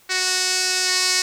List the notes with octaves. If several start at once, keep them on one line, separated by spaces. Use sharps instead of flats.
F#4